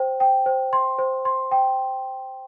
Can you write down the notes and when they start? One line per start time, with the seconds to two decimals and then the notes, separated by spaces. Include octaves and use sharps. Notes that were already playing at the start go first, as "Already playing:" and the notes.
Already playing: C5 G5
0.20 G5
0.46 C5
0.73 C6
0.99 C5
1.25 C6
1.51 G5